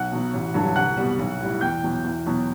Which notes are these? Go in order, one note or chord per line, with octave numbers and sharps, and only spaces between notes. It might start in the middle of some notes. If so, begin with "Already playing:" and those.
Already playing: B1 F#5 F#6
B2 F#3
A1
G2 D3 F#3
C2 F#5 F#6
B2 G3
B1
A2 G3
E2 G5 G6
B2 F#3
E2
B2 F#3